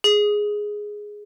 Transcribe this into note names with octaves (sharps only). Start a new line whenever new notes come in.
G#4